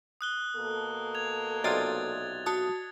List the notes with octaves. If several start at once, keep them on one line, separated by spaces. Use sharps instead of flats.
D#6 F#6 G7
B2 A#3 A4
G#6 F7
B1 C3 F4 D5 D#5 D#6 G#6 A6
F#4 A5 D#6